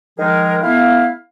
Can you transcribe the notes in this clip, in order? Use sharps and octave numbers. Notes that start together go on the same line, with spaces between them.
D#3 F3 G#3 D#4 G#4 A#4
A3 B3 E4 F5